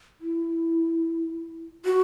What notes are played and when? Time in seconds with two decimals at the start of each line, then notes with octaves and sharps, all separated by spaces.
0.21 E4
1.85 F#4